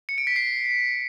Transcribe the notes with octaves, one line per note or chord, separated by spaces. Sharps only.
C#7
D7
B6
C7